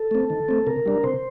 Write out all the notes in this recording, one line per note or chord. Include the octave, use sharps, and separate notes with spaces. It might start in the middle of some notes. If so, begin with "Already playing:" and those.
Already playing: A4
A3 C4
D#3
A3 C4
C3 A#4
G3 D4
C3 C5